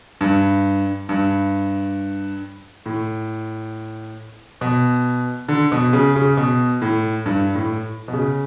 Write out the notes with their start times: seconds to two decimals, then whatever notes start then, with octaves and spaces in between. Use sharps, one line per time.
0.21 G2
1.09 G2
2.86 A2
4.61 B2
5.49 D3
5.72 B2
5.93 C#3
6.16 C#3
6.37 B2
6.82 A2
7.26 G2
7.55 A2
8.08 B2
8.13 C#3